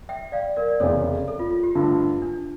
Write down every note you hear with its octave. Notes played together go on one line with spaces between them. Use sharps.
E5 G5
D5 F5
A#4 D5
D5
F1 E2 C#3 E3 A4 C#5
A4
F4
F4
G4
G2 D3 A3 F4
D4